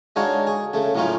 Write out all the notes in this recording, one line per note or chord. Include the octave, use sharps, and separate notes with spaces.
G#3 D4 D#4 F#4 C#5 F5
G#4
C#3 A3
A2 F#3 A3 C#4 D#4 F4